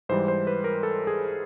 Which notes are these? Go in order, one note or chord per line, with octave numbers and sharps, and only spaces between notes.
G#2 E3 G3 C5
C5
B4
A#4
A4
G#4